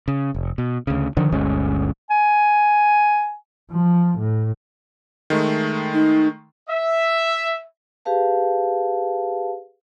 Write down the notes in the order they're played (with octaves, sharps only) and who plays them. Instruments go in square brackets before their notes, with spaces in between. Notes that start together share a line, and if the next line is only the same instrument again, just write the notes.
[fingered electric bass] C#3
F1
B2
D2 C#3
D3 D#3 F3 D4
G1 D2 G#3 C#4
[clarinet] G#5
[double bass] F3
A2
[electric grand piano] D#3 G#3 A3
[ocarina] D#4
[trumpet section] E5
[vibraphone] G4 G#4 B4 F5 A5